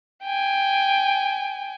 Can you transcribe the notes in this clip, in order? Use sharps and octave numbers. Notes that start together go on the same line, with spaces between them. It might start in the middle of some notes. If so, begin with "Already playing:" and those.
G5 G#5